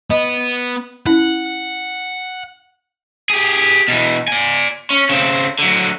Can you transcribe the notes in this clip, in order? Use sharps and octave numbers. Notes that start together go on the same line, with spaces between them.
B3 D#5
C#4 E4 F#5
G4 G#4
B2 E3
D5 G#5
C#4
C#3 C4
D3 F#3